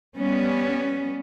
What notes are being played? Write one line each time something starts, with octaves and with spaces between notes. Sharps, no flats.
G3 B3 C#4